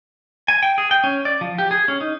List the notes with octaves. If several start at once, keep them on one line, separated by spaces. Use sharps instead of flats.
G#5
G5
G#4
G5
C#4
D5
F3
G4
G#4
C#4
D#4